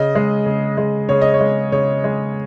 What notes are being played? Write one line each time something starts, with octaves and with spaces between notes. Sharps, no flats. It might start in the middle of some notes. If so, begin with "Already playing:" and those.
Already playing: C#3 D#5
G#3
C#3
G#3
C#3 C#5
D#5
C#5
G#3
C#3 C#5
G#3